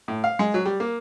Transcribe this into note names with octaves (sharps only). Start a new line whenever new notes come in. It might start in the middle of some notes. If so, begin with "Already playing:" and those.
A2
F5
G#3
F#3
G3
A#3